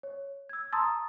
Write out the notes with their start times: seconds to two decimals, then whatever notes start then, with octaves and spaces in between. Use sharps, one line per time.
0.03 C#5
0.49 E6 G#6
0.72 A5 A#5 C6 D#6 E6 A6